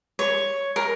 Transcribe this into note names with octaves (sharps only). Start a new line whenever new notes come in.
C#5
A#4